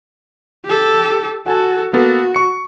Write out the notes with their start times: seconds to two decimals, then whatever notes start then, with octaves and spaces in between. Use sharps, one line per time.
0.65 G4 A4
1.46 F#4 A4 F#5 G#5 A5
1.93 A#3 B3 F#4 A4
2.34 C#6 C#7